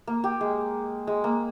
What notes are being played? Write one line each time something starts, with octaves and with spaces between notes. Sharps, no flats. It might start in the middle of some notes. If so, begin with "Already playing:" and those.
A#3
G4
G#3
G#3
A#3